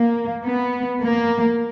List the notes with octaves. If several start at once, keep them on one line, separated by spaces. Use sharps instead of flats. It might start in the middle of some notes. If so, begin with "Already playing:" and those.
Already playing: A#3
B3
A#3